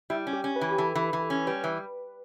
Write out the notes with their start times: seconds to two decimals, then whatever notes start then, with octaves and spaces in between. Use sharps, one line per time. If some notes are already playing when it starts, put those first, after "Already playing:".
0.10 G3 E4
0.27 C#4
0.33 G4
0.44 C#4
0.56 B4
0.61 E3
0.72 G4
0.78 E3 A4
0.95 E3
1.13 E3
1.30 C#4
1.47 G3 B4
1.64 E3